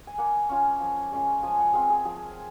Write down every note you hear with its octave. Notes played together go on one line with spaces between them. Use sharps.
G#5
A#3 F#5
C#4 F4
F3
G#3 C#4 F4
F3 G#5
F#5
C4 F4 G#4
G#4
F3 G#4